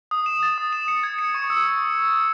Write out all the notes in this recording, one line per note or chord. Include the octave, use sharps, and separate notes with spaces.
D#6
E7
A6
D#6
E7
C#7
G#6
C#7
C#6
E6